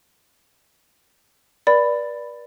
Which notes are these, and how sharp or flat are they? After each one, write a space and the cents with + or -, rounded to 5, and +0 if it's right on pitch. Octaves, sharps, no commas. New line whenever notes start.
B4 -45 D5 +0 B5 +10